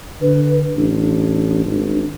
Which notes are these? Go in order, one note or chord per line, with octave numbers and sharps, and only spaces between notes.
D3 B4
A1 D4
G#1